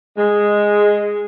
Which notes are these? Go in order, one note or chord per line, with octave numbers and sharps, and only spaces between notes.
G#3